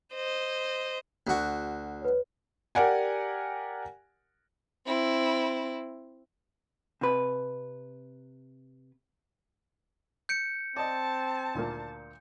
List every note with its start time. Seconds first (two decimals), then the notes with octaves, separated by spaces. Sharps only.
0.14 C5 D#5
1.27 D2 F#4
2.01 B4 C#5
2.75 G4 A#4 D5 F#5 G#5
4.86 C4 E4
7.01 C3 B4
10.29 G6 C#7 D7
10.77 C4 D5 D#5 A5
11.55 D2 A#2 A#3